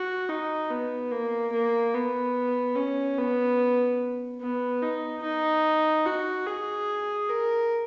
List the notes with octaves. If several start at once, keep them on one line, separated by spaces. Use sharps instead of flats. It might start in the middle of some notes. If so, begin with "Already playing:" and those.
Already playing: F#4
D#4
B3
A#3
A#3
B3
C#4
B3
B3
D#4
D#4
F#4
G#4
A#4